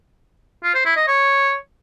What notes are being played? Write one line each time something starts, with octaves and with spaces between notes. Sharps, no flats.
F4
C5
E4
D#5
C#5